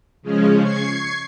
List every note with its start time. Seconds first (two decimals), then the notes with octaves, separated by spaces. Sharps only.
0.22 C#3 F3 G#3 C#4
0.62 C#6 G#6 C7